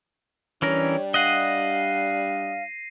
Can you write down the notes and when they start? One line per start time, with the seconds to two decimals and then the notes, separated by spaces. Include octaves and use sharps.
0.62 E3 G3 C#4 D4 A#4 C#5
1.14 D#5 F5 F#5 A#6 C7 D#7